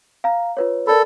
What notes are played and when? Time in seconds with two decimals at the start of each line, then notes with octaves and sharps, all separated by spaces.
0.24 F5 A#5
0.57 F4 B4 C#5
0.87 A4 A#4 D5 B5